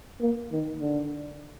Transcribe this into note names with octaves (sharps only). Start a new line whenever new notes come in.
A#3
D#3
D3